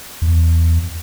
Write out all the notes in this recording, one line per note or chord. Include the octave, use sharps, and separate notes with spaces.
E2